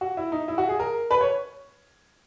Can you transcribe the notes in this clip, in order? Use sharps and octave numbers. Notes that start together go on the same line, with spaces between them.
F#4
E4
D#4
E4
F#4
G#4
A#4
B4
C#5